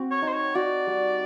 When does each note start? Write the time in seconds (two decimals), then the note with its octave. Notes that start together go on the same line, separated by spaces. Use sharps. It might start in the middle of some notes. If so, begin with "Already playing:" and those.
Already playing: C4 F#4
0.11 C#5
0.22 D#4
0.28 C5
0.33 C#5
0.55 F#4 D5
0.87 G3